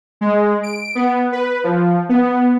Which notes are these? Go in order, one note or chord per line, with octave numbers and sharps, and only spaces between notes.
G#3
D7
B3
B4
F3
B3